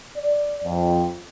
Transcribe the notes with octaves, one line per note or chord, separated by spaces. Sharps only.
D5
F2